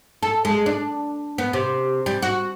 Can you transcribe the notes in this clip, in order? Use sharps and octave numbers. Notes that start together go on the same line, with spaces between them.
A4
G#3
D4
B3
C3
G3
F#4